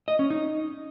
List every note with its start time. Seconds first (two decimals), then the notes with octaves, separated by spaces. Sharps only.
0.08 D#5
0.19 C#4
0.30 D#4